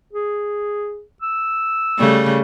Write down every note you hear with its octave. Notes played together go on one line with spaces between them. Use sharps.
G#4
E6
C#3 G3 A3